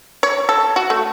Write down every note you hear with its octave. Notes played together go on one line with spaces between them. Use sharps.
C#5
A4
F#4
A3